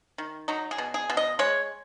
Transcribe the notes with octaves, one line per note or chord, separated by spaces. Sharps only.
D#3
F#3 D#4
G#4
B2
G#4
B2
D#5
G#3 C#5